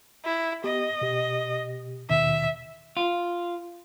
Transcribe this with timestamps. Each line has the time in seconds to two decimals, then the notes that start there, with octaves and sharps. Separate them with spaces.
0.25 E4
0.64 B3 G4 D#5
1.01 B2 G4
2.10 D#2 B2 D#3 E5
2.97 F4